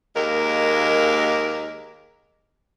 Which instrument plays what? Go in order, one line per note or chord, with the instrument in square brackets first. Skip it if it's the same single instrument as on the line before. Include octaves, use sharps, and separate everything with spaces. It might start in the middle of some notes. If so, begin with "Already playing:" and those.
[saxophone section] D#2 G#3 A#3 A#4